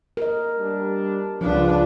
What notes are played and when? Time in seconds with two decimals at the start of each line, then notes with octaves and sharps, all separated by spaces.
0.17 A#4 D#5
0.58 G3 D4
1.41 C#2 F3 D4 F4 B4